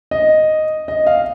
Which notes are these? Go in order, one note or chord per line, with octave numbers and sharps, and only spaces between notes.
D#5
D#5
F5